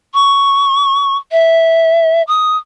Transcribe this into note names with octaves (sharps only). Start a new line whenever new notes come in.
C#6
E5
D#6